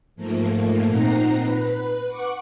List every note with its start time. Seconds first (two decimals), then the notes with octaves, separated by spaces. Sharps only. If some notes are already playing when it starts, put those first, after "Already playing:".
0.16 G#2 F3 A3 A#3
0.86 A#2 C4 D#4 F#5 A#5 C7
1.39 B4
2.07 F#5 C#6 D6 F#6